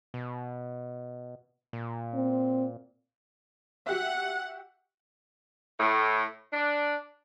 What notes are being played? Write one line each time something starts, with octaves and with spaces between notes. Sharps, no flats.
B2
A#2
C4
F#4 G4 E5 F#5
A2
D4